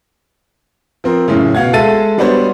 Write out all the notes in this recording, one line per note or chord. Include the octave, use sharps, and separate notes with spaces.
F3 C4 A#4
F#2 A2 C#3
B2 F5 F#5 G#6
G#3 A4 E5 A5 A6 D#7
G3 B3 D4 F#4 C5 C#5